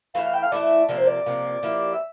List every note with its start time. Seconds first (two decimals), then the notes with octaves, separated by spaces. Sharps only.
0.14 E3 A3 E4 A4 F5
0.24 F5
0.34 G5
0.43 F5
0.52 E3 A3 E4 A4 D5
0.88 C3 F3 A#3 D5
0.98 C5
1.07 D5
1.26 C3 F3 A#3
1.63 F3 A#3 E4 G4
1.93 E5